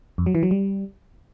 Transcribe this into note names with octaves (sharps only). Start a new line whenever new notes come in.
F2
F#3
E3
F#3
G3